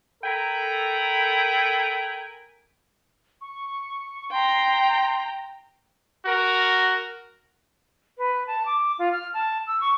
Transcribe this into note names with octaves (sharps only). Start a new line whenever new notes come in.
A4 A#4 G5 G#5 A#5 B5
C#6
G5 A#5 C6
F#4 A#4
B4
A5
D6
F4
F6
A5
E6
C#6